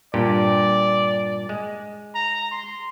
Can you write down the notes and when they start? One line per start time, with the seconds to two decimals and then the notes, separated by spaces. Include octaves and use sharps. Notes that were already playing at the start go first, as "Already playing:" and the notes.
0.14 G2 A#2 G4 D5
1.49 G#3
2.15 A#5
2.51 C6